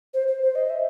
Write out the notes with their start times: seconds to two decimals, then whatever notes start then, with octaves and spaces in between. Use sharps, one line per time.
0.14 C5
0.28 C5
0.42 C5
0.55 D#5
0.70 E5